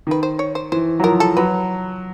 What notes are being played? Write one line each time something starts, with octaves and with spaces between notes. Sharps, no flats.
D#3 B4
C5
C#5
C5
E3 C5
F#3
F3 A#4
A4
F#3 B4